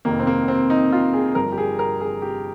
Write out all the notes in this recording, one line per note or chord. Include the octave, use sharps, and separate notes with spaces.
F1 F2 D#3 A#3
C4
A#3
C4
D#4
F4
G#4
G1 G2 F3 A#4
G4
G#4
A#4
G#4
G4